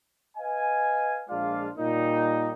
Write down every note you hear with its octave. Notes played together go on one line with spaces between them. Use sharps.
B4 D#5 F5 G#5
A#1 G#3 D4 F4 D5 F5
A#2 G3 D#4